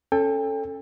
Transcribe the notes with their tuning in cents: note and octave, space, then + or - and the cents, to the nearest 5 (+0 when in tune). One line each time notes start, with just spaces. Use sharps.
C#4 -5 A4 +0 G5 +35